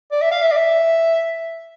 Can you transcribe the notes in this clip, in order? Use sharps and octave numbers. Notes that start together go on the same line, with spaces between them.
D5
E5
F5
E5
D5
E5